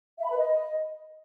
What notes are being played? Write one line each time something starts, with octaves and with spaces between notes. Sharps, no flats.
E5
B5
B4
D#5